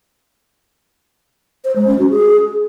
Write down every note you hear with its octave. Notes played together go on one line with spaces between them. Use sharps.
C5
G#3
C#4
F#4
G#4